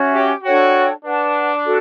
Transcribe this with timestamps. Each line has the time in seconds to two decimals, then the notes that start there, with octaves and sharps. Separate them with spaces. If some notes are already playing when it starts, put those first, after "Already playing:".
Already playing: C#4 F#4 C#5 E5
0.14 G4
0.43 D4 F#4 A4 C#5 G5
1.04 D4 B4 F#5 A5
1.65 F#4 A4